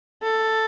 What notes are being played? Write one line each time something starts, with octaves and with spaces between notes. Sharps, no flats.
A4